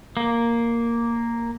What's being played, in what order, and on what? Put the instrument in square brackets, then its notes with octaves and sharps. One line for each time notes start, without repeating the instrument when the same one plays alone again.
[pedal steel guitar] A#3